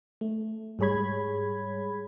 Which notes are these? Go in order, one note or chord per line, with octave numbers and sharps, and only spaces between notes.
A3
G#2 G3 G#4 C#5 B5 G#6